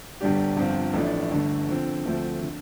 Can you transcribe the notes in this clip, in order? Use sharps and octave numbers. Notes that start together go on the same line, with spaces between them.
G1 G2 G3 D4 G4
G1 G2 F3 C4 F4
A1 A2 F3 A3 D4
G1 G2 D3 A3
D3 F3 C4
D2 D3 F3 A3 C4
D3